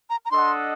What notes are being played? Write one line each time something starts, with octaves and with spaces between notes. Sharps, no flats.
A#5
A#5
D4 A4 D#5 F#5 C6